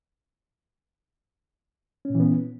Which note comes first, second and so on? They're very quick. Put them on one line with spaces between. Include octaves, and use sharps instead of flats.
C#4 A#2 E3 B3